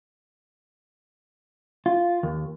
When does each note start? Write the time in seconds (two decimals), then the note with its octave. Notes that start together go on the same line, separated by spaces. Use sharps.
1.86 F4
2.23 D#2